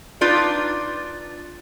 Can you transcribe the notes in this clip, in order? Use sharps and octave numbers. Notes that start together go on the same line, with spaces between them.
D4 D#4 F4 B4